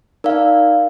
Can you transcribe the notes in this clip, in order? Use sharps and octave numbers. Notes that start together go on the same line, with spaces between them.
D#4 A#4 D5 F5